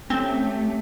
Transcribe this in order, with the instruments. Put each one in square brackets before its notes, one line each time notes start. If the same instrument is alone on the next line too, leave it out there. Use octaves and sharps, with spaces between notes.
[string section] A3 C#4 G4 [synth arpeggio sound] C4